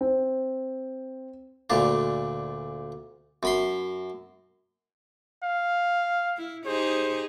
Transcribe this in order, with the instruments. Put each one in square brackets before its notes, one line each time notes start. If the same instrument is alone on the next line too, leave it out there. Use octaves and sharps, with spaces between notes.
[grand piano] C4
[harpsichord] D2 A#2 D4
F#2 B5 C6
[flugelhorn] F5
[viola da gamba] E4
[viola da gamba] D#4 G4 G#4 [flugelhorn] C5